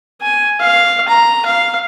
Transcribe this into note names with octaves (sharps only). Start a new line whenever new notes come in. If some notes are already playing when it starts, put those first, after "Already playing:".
G#5
F5
A#5
F5